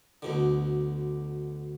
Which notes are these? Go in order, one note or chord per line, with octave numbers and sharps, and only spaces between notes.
D2 B2 D3